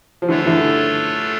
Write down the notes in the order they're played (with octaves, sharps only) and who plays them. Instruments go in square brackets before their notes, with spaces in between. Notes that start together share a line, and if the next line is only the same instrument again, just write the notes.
[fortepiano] F3
[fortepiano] D3 E3 [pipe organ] A3 D4 F4 A4 C#5
[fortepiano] D3 E3